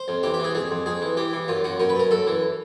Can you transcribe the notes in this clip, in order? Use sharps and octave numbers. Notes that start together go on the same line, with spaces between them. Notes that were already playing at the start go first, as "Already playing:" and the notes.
Already playing: C5
F2
E3 G4
G4
E3 G#4
F2 G#4
F2
F2 G#4
E3
E3 G4
E3
F#2 F4
F#2 F#4
F#2 A#4
B4
F#2 A#4
F#2 A4
E3